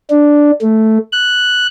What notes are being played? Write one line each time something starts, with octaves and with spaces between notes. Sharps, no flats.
D4
A3
F#6